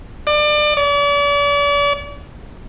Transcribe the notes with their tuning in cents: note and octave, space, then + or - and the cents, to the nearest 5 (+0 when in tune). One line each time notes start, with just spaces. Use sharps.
D5 +30
D5 -40